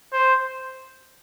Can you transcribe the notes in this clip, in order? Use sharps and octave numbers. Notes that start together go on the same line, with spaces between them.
C5